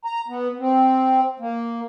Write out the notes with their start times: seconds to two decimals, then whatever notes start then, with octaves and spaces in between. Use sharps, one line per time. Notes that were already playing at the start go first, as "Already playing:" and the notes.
0.05 A#5
0.28 B3
0.59 C4
1.40 A#3